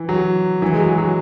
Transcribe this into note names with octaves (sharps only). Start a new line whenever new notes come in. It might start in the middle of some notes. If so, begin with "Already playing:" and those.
Already playing: E3
F#3
E3
G#3
F#3
F#3